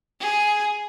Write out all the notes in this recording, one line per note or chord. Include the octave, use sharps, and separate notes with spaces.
G#4